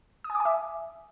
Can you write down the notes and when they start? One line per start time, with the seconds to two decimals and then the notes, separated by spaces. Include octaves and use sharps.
0.24 D#6
0.30 G#5
0.35 D6
0.40 G#5
0.45 E5